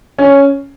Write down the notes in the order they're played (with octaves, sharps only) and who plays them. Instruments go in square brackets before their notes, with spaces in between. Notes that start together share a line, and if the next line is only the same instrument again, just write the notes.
[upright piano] C#4